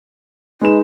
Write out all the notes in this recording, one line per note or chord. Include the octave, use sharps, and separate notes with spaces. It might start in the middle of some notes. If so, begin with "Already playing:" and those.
G#3 D#4 B4 E7